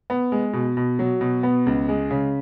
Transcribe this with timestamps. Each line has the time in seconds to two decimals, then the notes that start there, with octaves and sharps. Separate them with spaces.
0.10 B3
0.32 G#3
0.53 B2
0.77 B2
0.99 F#3
1.21 B2
1.43 B3
1.66 C#2
1.89 G#3
2.10 C#3